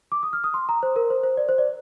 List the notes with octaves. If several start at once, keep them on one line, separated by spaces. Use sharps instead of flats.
D6
D#6
F6
D#6
C6
A#5
C5
A#4
C5
C5
D5
C5
D5